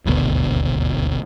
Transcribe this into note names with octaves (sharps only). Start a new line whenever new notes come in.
D#1 G#1 D2 B2